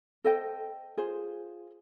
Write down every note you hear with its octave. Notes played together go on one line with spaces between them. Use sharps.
A4 C5 D#5 G5
F4 G#4 C5